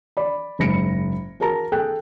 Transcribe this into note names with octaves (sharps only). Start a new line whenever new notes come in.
D5 B5
F#1 G#2 B5 A#6 C#7 D7
F#4 G#4 A#4 A5 A#5
G#4 A4 G5 F#6